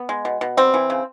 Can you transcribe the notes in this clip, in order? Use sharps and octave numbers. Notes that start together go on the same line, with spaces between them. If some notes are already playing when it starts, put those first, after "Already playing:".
Already playing: B3
G#3
B2
B2
G3 C4
E3
C#3